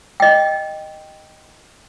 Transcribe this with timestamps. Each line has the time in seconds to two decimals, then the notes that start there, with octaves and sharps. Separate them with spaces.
0.20 D#5 G5